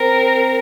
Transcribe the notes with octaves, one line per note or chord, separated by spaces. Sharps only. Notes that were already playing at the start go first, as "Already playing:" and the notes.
Already playing: C4 A#4